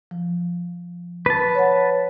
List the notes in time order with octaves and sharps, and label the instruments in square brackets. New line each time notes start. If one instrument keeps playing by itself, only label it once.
[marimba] F3
[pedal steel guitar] B4 A5
[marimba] C#5 F#5